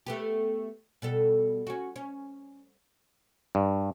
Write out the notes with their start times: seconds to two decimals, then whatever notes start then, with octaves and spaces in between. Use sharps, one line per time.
0.06 A3 B3 G4
1.02 B2 G3 A4
1.67 C#4 F#4
1.96 C#4
3.55 G2